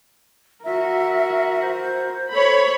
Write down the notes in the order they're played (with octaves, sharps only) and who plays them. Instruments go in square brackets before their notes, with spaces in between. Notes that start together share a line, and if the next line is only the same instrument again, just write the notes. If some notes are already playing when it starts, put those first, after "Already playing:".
[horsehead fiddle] F#4 A#4 [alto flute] E5
[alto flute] C5
[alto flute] A4 [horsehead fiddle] C5 [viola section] C#5 B5